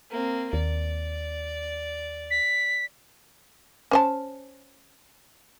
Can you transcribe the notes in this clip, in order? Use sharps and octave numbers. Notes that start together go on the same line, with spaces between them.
A#3 C4
D#2 D5
B6
C#4 C5 A5